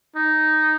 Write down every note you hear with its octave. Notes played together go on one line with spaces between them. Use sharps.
D#4